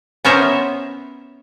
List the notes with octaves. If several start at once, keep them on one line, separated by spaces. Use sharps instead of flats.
B3 C#4 A#4 C5 C#5 E5